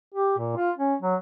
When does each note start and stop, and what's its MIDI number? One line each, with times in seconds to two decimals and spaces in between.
0.14 0.33 67
0.38 0.53 46
0.57 0.71 65
0.77 0.94 61
1.02 1.15 54